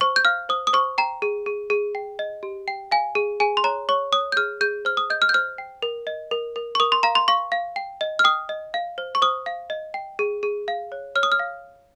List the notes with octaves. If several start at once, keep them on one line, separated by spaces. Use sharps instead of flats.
C5 C#6
G6
F5 F6
C5 D#6
D#6
C5 C#6
G5 A#5
G#4
G#4
G#4
G5
D#5
G4
G5
F5 G#5
G#4
G#4 G#5
C6
C#5 A#5
C#5 C#6
C#5 D#6
G6
G#4 F6
G#4 G6
C5 F6
D#6
D#5 G6
F6
G6
C5 F6
G5
A#4
D#5
A#4
A#4
C#6
A#4 D#6
C6
F5 A#5
C6
F5 C#6
F5
G5
D#5
F6
G5 D#6
D#5
F5
C5
C#6
C5 D#6
F5
D#5
G5
G#4
G#4
F5
C#5
C#5 F6
D#6
F6
F5